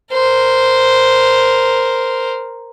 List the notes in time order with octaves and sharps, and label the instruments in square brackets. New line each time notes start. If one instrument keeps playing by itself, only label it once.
[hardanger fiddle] A#4 C5